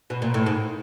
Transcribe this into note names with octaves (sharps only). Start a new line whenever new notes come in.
B2
A#2
A2
G#2